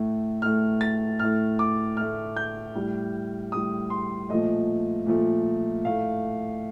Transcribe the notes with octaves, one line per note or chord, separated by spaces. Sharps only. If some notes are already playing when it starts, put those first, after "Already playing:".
Already playing: A2 A3
A2 A3 F6
A6
A2 A3 F6
D6
A2 A3 F6
G6
A2 G3
A2 G3 D#6
C6
A#2 F3 A3 D#5
A#2 F3 A3
A2 A3 F5